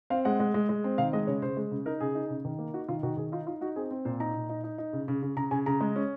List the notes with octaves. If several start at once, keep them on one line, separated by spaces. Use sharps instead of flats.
C4 F5
G#3 F#5
G#3
G#3
G#3
C4
D#3 F5
G#3 D#5
C#3 C#5
C#3 C5
G#3
C#3
D#4 A#4
C#3 G#4
D#4
C#3
D#3
A#3
D#4 F#4
D#3 F4
D#3 F#4
D#3 G#4
D#4 F4
D#4 F4
D#4 F#4
C4 G#4
C4
A#2 C5
D#4 A#5
A#2
D#4
D#4
D#4
C#3
C#3
C#3
C#3 A#5
C#3 G#5
C#3 A#5
G#3
C#4